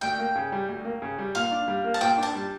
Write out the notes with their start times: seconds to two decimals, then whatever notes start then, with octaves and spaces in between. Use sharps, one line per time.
0.01 D2 G5
0.18 A#3
0.35 C#3
0.52 G3
0.69 D2
0.85 A#3
1.02 C#3
1.18 G3
1.35 A#2 F5
1.51 D4
1.68 G3
1.84 A#3
1.94 A5
2.01 A#2 G5
2.18 D4
2.23 A5
2.35 G3